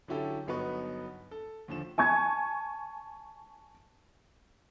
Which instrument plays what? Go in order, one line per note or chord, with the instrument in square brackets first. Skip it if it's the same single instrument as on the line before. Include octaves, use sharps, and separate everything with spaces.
[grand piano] D3 F#3 C#4 E4 G4 A4
G1 F#3 B3 D#4 B4 C#6
A4
D#2 D3 F3 E7
[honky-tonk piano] G#5 A5 C#6 G#6